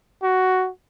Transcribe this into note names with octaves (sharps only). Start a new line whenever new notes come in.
F#4